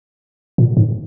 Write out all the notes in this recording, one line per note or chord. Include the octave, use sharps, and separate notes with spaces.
A#2
G#2